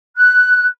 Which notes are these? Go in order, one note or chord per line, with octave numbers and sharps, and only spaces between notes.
F#6